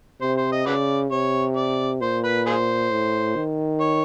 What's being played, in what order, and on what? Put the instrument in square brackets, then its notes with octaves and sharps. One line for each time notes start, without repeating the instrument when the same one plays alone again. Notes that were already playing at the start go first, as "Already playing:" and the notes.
[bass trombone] C3 [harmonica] C5
[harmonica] C5
D#5
[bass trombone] C#3 [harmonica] F#4 B4 D5
[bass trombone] C3 [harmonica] C#5
[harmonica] D5
[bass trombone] A#2 [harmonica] C5
[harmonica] B4
F4 G#4 C5
[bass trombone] A2
D#3
[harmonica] C#5